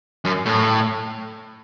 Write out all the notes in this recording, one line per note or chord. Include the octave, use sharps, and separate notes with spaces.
F#2
A2